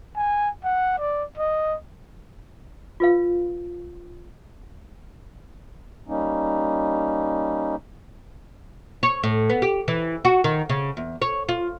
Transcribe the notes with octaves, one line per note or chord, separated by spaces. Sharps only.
G#5
F#5
D5
D#5
F4 B4 F5
G3 A#3 C#4 D#4
C#5
A2
B3
G4
E3
F#4
D#3
C#3
E2
C#5
F4